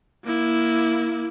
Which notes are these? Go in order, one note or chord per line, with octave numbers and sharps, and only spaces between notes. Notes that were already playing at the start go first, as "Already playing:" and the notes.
A#3 E4